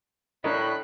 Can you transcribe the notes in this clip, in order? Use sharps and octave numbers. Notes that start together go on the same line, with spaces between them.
A2 D4 A#4 D#5 B5 F#6